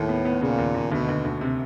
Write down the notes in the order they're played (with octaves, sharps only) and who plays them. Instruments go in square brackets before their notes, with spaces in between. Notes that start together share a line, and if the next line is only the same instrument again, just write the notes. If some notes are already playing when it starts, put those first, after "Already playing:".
Already playing: [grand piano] D#2 [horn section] A2
[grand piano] B3
B3
[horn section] A#2 [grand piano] C#3
[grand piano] D#2
D#2
[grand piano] D2 [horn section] B2
[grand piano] D2
D2
C3